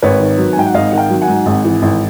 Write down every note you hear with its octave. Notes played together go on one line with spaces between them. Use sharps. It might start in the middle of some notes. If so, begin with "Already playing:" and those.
G#1 B4 C#5
D#3
F#3
G#5
G#2 G5
F#5
G#1 D#5 F5
D#3 F#5
F5 G5
F#3
F#5 G#5
G#2
G#1
E3
G#1